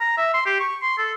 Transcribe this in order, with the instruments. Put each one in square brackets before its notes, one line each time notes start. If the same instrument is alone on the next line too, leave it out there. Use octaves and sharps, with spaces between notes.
[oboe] A#5
E5
C6
G4
C#6
C6
A4